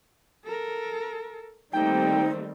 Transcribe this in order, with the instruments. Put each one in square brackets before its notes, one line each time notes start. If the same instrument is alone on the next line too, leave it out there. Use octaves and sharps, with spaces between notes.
[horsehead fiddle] A4 A#4
[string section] D#3 G3 C4 [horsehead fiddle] A3 A#3 [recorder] D#4 [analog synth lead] G5